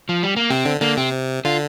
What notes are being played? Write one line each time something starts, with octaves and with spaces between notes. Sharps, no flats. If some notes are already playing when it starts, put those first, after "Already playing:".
F3
G3
A#3
C3 C4
D3
D3 A#3
C3 C4
D3 F4